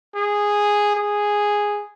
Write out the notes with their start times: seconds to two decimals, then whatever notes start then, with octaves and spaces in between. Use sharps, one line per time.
0.15 G#4
0.95 G#4